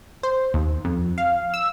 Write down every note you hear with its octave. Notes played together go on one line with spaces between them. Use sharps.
C5
D#2
F2
F5
E6